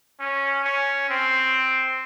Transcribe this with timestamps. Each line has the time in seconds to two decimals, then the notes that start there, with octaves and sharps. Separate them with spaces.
0.20 C#4
0.64 C#4
1.10 C4